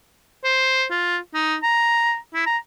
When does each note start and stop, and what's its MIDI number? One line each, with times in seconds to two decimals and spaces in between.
0.44 0.86 72
0.91 1.18 65
1.34 1.57 63
1.63 2.17 82
2.34 2.45 64
2.46 2.57 82